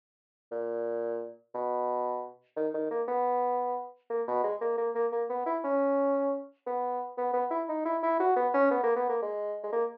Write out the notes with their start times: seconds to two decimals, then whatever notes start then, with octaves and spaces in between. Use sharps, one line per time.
0.51 A#2
1.55 B2
2.57 D#3
2.74 D#3
2.91 A#3
3.08 B3
4.10 A#3
4.28 B2
4.44 G#3
4.61 A#3
4.78 A#3
4.95 A#3
5.12 A#3
5.30 B3
5.46 E4
5.64 C#4
6.67 B3
7.18 B3
7.34 B3
7.51 E4
7.69 D#4
7.85 E4
8.03 E4
8.20 F#4
8.36 B3
8.54 C#4
8.71 B3
8.83 A#3
8.96 B3
9.09 A#3
9.22 G#3
9.64 G#3
9.73 A#3